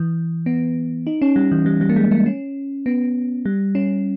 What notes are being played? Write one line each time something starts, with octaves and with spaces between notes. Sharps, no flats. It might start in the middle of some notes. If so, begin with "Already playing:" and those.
Already playing: E3
B3
D#4
C#4
G3
E3
G3
G3
A#3
G#3
A#3
C#4
B3
G3
C#4